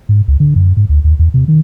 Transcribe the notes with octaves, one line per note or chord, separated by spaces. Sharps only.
G#2
C#2
D3
F#2
G#2
D2
D#2
E2
C3
D#3